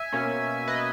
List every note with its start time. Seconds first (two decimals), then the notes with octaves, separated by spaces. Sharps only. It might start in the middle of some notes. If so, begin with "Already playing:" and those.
Already playing: E5 G#5
0.13 B2 A#3 C#4
0.68 B4 D#5